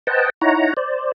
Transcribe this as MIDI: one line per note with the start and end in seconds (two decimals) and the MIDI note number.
0.07 0.30 71
0.07 0.30 72
0.07 0.30 75
0.07 0.30 78
0.07 0.30 79
0.07 0.30 81
0.41 0.74 63
0.41 0.74 64
0.41 0.74 73
0.41 0.74 78
0.41 0.74 82
0.77 1.12 72
0.77 1.12 74